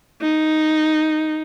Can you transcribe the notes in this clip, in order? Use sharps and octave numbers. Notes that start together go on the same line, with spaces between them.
D#4